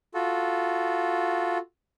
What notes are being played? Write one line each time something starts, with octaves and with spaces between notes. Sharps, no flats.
F4 F#4 A4